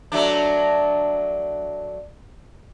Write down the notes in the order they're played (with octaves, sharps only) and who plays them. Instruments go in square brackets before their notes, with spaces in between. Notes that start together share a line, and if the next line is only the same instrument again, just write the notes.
[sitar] F#3 A3 D4